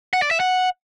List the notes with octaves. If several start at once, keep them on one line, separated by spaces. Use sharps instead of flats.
F#5
D5
E5
F#5